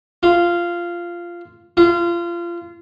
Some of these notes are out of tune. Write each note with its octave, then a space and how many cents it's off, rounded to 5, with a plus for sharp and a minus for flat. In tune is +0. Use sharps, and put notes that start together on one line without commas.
F4 -10
F4 -25